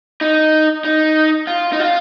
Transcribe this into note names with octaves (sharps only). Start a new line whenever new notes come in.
D#4
D#4
F4
D#4
F4